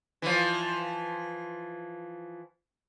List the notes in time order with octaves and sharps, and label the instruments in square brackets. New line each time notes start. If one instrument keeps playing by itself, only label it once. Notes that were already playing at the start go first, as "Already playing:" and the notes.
[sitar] E3 F3